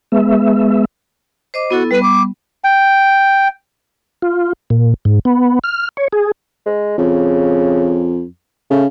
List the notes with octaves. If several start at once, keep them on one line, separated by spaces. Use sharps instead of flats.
G#3 B3 E5
C5 D#5 D6
B3 E4 F#4 A4
G3 B3 B4
D6
G5
F4
A#2
G#2
B3
F6
C#5
G#4
G#3
F2 C#3
C#3 A3